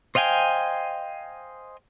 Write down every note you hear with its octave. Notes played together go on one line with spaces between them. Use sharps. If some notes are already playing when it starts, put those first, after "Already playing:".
C5 D#5 F5 G5 G#5